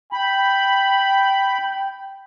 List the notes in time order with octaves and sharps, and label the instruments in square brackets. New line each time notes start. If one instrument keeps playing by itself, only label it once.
[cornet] G5 [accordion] B5